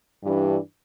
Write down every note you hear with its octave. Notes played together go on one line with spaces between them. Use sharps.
G2 E3 G3 D4